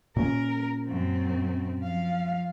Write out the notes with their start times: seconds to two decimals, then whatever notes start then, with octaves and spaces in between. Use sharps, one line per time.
0.16 A#2 C#4 A#4
0.85 F#2 C4
1.80 F3 F5